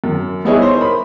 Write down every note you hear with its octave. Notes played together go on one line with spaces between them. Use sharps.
F#2
G3 B3 D#4 E4 G#4 C#5
C5 C#5
A#4 B5